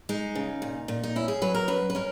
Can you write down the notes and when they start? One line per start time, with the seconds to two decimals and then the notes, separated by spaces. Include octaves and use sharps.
0.09 G#3 D#4
0.35 C#3
0.62 A#2
0.88 A#2
1.04 D#4
1.16 C#4 E4
1.28 G#4
1.42 F#3 B4
1.55 A#4
1.68 F#2 B4
1.90 B4
1.95 C#4 A#4